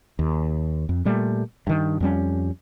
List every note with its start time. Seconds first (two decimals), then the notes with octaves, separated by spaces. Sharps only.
0.19 D#2
0.89 F2
1.05 A#2 G3 A3
1.67 G2 D#3
2.00 F2 G3 C#4